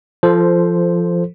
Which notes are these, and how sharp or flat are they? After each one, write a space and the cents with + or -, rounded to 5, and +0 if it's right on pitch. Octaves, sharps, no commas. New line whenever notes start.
F3 -10 A4 +0 C5 +0